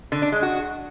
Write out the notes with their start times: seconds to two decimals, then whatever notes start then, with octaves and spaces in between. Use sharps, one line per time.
0.12 D3
0.22 D4
0.32 G#3
0.42 F#4